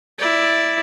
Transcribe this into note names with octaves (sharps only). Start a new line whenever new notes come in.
E4 D5